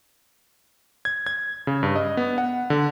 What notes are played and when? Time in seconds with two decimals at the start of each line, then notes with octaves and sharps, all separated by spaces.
1.05 G#6
1.27 G#6
1.67 C#3
1.83 G2
1.96 D#5
2.17 B3
2.38 F#5
2.70 D3